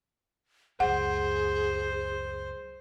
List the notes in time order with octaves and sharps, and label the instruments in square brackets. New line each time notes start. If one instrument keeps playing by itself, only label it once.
[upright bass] C#2 F#2 [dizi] G#4 [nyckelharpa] C5 [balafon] F#5